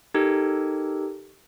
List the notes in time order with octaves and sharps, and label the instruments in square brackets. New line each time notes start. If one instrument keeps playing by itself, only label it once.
[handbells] D#4 G4 A4 A#4